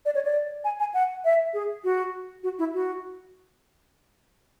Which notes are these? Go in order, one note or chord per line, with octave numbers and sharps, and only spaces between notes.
D5
C#5
D5
G#5
G#5
F#5
E5
G#4
F#4
F#4
E4
F#4